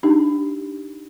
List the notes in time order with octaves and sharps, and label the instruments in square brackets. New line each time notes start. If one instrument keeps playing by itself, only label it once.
[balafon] D4 D#4 G4